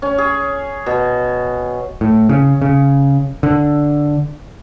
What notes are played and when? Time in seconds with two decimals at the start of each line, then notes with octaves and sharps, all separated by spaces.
0.02 C#4
0.18 G#4
0.86 B2
2.01 A2
2.29 C#3
2.62 C#3
3.43 D3